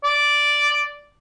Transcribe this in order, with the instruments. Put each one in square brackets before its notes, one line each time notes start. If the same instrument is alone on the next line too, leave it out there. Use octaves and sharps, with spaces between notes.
[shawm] D5